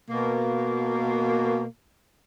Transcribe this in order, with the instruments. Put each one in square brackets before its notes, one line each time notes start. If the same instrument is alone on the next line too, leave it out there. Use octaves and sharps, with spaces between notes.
[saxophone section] B2 A#3